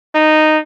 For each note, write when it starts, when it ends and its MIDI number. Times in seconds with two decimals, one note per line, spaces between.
0.14 0.59 63